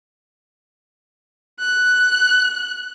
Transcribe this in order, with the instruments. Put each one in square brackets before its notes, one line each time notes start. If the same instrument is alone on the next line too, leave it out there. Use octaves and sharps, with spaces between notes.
[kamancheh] F#6